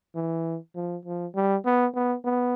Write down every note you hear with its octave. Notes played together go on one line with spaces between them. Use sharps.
E3
F3
F3
G3
B3
B3
B3